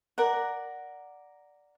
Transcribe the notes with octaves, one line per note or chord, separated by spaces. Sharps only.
A#4 D5 F#5